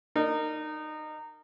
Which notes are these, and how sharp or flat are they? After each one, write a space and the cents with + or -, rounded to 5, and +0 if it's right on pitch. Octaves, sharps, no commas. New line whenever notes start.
D#4 -20 A#4 -20 D5 +0